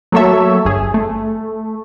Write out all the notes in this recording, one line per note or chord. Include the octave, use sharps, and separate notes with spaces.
F#3 A3 A#3 A4 C#5 E5
G1 G#4
A3